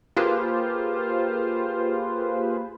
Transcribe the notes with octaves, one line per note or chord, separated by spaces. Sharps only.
A#3 F4 G4 G#4 B4 C5